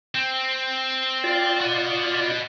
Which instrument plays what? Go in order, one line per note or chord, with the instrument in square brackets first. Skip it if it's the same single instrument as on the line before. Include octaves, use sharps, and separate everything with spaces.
[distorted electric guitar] C4
[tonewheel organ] F4 D5
[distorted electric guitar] F#4 D#5